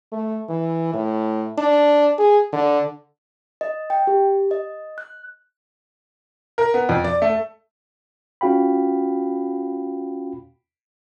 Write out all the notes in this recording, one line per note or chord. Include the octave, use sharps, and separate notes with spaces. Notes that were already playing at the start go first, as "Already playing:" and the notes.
A3
E3
A2
D4
G#4
D3
D#5
G5
G4
D#5
F#6
A#4
B3
F2
D5
A3
C#4 F4 F#4 F5 G5 B5